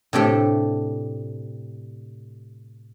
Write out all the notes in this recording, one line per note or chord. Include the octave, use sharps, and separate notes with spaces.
A2 C3 D4 G4 A4